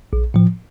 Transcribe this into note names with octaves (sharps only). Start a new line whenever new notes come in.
A#1
A2 F3